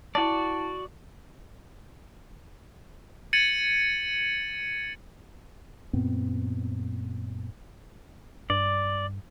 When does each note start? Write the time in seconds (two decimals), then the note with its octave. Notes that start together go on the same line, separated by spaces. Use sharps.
0.15 E4 F#4 D5 A5
3.33 G#6 A6 C#7 D#7 F#7
5.93 F#2 A#2 B3 C4
8.50 G2 D5